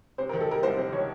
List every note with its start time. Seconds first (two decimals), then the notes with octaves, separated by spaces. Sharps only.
0.18 C3 C5
0.29 A#4
0.33 D#3
0.41 A4
0.48 G3 A#4
0.63 C2 C5
0.77 C3 C5
0.92 D#3 C#5